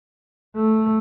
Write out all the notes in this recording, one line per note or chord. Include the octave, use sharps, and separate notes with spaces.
A3